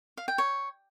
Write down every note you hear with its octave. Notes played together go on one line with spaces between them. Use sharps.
F5
G5
C#5